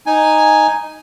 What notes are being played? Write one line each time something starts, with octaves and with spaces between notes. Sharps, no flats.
D#4 G#5